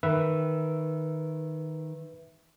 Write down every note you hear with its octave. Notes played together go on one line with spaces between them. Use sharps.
D#3 B4 E5 E6